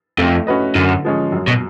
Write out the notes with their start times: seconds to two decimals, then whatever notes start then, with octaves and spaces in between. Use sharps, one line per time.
0.18 F2 A3
0.47 C#4 F#4 B4 D#5
0.75 F#2 D3
1.05 F3 G#3 C#4
1.32 F#2
1.48 B2